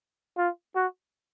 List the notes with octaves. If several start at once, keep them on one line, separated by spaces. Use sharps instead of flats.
F4
F#4